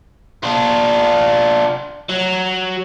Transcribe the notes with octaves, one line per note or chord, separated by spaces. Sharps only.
D4 F4
F#3